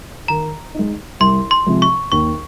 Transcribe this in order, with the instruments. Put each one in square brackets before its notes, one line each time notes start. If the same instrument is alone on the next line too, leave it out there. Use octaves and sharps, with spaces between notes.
[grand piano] D#3 [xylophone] A#5
[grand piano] G#3 D#4
[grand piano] C2 [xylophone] C6
[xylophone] C6
[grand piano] C3 F3 G#3
[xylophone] C#6
[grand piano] D#2 [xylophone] C#6